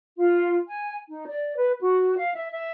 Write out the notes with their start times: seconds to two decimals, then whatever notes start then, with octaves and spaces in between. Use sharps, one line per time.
0.17 F4
0.68 G#5
1.09 D#4
1.27 D5
1.56 B4
1.81 F#4
2.16 F5
2.34 E5
2.52 E5